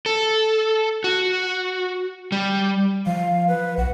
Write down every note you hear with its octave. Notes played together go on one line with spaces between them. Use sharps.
A4
F#4
G3
F3 F5
B4
B1 F#5